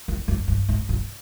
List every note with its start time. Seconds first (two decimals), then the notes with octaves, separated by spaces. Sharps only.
0.08 E2
0.28 F#2
0.48 G2
0.68 G#2
0.89 G2